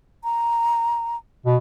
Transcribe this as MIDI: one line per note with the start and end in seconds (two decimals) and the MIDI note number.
0.24 1.17 82
1.46 1.56 47